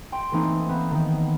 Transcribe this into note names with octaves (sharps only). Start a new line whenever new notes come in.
G5 C6
E3 A3 A#3 C4 D#4
B3 C4
D#3